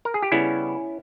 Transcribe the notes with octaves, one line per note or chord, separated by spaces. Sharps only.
A#4
G#4
G4
C#3 G3 B3 C#4 E4